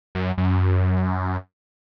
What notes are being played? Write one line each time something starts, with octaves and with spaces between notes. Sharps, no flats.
F#2
F#2